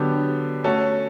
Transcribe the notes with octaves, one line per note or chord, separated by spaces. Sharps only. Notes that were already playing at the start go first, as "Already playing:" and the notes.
Already playing: D3 F#3 B3 D4 G4
A3 C#4 F#4 A4